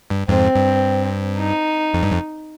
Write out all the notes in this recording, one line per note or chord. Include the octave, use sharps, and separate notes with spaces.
G2
F2 G#2 C4
G2
D#4
F2
G2
F2